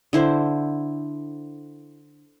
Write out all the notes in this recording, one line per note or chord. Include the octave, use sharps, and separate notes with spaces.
D3 E4 C5